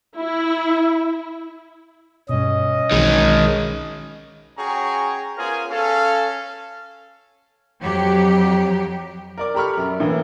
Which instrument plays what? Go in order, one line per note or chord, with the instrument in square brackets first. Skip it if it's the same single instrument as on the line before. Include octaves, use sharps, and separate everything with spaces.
[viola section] E4
[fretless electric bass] G2 B2 [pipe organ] C#4 D#5
[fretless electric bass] B1 E3 [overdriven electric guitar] D#3 G#3
[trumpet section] C#4 F#4 G#4 G5 A#5 C#6
B3 C#4 F4 G#4 A#4 C5
C#4 A4 F5
[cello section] F2 F#3 G4
[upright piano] A#4 D5 D6
G4 A4 A#5 B5 C#6 F6
F#2
A2 E3 A#3